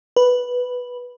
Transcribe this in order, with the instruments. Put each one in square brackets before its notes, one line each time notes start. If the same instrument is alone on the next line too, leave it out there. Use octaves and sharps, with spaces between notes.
[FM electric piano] B4